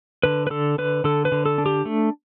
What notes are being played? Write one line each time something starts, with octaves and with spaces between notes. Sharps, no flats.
D3 B4
B4
D3 A4
D3 B4
D3 A4
B4
D3
A4
D4
G4
A3